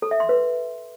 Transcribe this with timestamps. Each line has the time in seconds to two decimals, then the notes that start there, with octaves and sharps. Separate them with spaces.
0.02 A4
0.11 E5
0.20 C6
0.29 B4